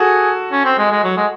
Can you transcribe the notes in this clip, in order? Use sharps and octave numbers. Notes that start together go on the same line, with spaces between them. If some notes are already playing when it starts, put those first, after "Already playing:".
Already playing: F#4 G#4 A4
C#4
C4
G#3
G#3
F#3
G#3